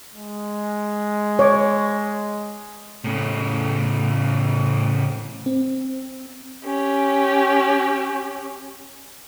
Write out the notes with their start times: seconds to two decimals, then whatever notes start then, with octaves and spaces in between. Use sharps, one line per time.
0.13 G#3
1.39 C#5 D6
3.04 A2 C#3
5.46 C4
6.64 C#4 G4